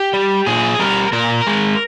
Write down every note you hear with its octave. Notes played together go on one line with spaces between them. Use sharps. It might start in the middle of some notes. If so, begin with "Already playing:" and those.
Already playing: G4
G3
A#2 G#4
G3 A#4
A#2 A#4
G#3